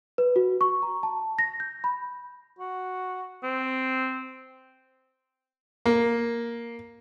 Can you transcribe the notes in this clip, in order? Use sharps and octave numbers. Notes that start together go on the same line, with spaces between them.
B4
F#4
C#6
A#5
A5
A#6
G6
B5
F#4
C4
A#3